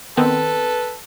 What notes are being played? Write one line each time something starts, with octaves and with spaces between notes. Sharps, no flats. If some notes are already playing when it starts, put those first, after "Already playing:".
D#3 B3 C4 A4 B4